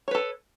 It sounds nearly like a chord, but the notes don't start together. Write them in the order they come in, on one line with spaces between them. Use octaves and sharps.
C#5 B4 A4